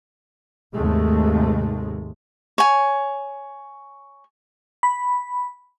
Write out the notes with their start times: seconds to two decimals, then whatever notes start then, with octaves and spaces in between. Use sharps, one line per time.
0.75 D#2 G#2 C3 D#3 G#3 A3
2.58 C#5 G#5
4.83 B5